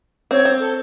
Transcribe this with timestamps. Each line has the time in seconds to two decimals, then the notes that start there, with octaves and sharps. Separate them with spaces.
0.31 C4 C#5
0.45 C4
0.59 A4